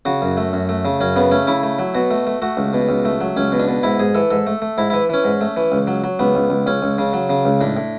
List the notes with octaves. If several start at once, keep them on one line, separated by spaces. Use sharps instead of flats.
C#3 F#4
F#2
A3
F#2
A3
C#3
F#2 C#4
C#3 B3
A3 C#4
C#3 E4
A3
F#3
B2 F#4
A3
A3
A3 F#4
C#2
B2
C#2
A3
F#3
C#2 C#4
B2
D4
B2
G#2 E4
G#2 G#4
E3 A4
G#2 A4
A3
A3
G#2 E4
E3 E4
E3 C#4
G#2
A3
E3
C#2
F#3
F#3
C#2 B3
C#2
C#2
C#2 C#4
C#2
C#3
F#3
C#3
C#2
A2 D4
A2